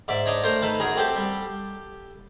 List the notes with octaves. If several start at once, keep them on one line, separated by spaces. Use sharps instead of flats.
G#2 D5 E5
D4 C#5 D#5
A3 A#4 C5
D#3 A4 B4
F#2 G#4 A#4
C4 G4 A4
G3